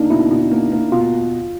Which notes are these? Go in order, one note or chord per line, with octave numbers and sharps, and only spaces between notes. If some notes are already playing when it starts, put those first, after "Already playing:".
Already playing: A#3 D4 D#4
B2 E4
B2
A#3
A#3
B2 F4